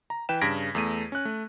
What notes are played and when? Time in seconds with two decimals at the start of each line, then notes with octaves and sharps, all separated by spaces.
0.10 A#5
0.29 E3 B4 G5 E7
0.41 G2 C#3 G#6 A#6 B6 D7
0.75 E2 A3 D#7
1.12 C#4 F#6
1.25 A3